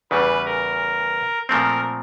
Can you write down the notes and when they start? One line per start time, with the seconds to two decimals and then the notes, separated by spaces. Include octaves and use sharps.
0.11 E2 C#3 E3 G3 B4
0.45 A#4
1.49 A#2 F3 A3 C4 A#4